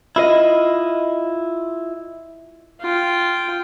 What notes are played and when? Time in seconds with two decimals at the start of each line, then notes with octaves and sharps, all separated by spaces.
0.16 E4 F4 D#5
2.81 F4 G5